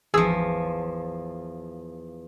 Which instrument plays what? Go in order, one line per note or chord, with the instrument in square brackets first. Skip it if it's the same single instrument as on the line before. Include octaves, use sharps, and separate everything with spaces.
[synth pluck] G#1 G#4 E6 [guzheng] E2 F3